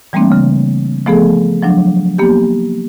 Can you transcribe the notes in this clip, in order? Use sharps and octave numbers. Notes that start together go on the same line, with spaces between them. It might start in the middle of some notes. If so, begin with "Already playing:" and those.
E3 G3 A3 A#3 C4 D4
C#3
F3 A3 B3 G#4 A4
F3 F#3 D4
A#3 B3 G4